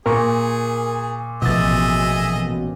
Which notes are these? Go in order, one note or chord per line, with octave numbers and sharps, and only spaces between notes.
A#2 G#4 A#4 C#6
A1 B2 F3 G#4 D#5 E5 A6